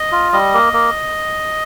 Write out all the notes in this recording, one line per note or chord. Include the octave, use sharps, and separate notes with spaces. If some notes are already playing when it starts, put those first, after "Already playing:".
Already playing: D#5
F4
G3 D#5
A#3
A#3